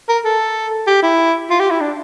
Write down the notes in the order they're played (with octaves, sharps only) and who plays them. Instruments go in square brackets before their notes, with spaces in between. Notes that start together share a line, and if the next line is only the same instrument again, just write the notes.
[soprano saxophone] A#4
A4
G4
E4
F4
G4
E4
D4